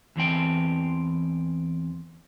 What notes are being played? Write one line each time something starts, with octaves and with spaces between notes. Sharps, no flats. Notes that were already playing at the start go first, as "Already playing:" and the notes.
E2 E3 C4 G5